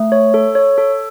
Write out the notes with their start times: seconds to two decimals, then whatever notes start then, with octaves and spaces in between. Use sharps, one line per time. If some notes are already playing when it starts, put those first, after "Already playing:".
Already playing: A3
0.12 C#5
0.34 A4
0.55 C#5
0.78 A4